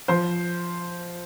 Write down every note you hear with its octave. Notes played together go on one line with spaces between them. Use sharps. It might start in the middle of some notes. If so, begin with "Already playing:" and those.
F3 C5